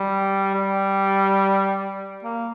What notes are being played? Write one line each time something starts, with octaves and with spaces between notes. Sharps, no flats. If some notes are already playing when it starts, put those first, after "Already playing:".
Already playing: G3
G3
A#3